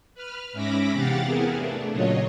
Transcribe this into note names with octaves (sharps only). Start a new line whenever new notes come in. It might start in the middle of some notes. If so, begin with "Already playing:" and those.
B4 F6
G#2 C#4 E5 B5 D6 A#6
E2 C3 G4 F5 F#5 A6
B3 C4 E4 G#4 A#4
A3 D4
A#2 C#3 F#3 F4 C#5 D#5